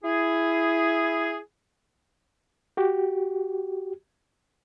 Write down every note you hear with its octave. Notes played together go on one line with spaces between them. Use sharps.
E4 G#4
F#4 G4